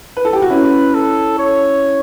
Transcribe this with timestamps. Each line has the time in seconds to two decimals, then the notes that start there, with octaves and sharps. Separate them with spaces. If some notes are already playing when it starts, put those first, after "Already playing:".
0.17 B4
0.25 A4
0.33 G4
0.42 F#4
0.50 C#4 E4 B4
0.94 A4
1.39 C#5